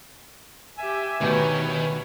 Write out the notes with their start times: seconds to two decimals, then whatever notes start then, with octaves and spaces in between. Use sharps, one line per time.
0.78 G4 E5 G#5
1.21 D2 B2 D#3 G4 B4 C#5